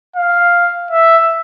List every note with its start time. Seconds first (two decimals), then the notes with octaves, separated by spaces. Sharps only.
0.16 F5
0.91 E5